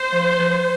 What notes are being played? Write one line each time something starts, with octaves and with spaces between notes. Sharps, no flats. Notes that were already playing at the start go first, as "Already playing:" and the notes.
Already playing: C5
F3
F3